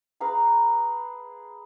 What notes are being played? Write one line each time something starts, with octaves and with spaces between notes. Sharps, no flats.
G#4 B4 F5 A#5